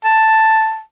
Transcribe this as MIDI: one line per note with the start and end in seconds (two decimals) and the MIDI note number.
0.04 0.80 81